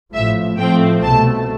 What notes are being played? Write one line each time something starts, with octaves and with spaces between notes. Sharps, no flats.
A1 A2 F3 E5
A2 F3 A3 C4 G5
C2 B2 A3 A5